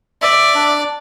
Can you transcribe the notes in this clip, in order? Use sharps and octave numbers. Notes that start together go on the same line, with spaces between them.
D5 E5
D4